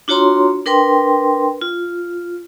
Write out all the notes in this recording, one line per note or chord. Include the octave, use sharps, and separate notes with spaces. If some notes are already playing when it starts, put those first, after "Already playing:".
D4 F4 F#4 C#5 A#5 C6
D4 A#4 B4 G5 C6
F4